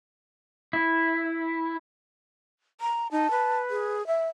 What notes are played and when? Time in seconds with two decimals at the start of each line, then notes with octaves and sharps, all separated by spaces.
0.73 E4
2.81 A#5
3.12 D#4 A5
3.31 B4
3.70 G#4
4.07 E5